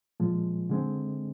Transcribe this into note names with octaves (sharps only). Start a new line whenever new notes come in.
A#2 F3 G#3
D3 G#3 C4